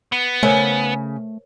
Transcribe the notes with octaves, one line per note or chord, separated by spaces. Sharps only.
B3
C#3 A3 A#4 C5 C#5 G#5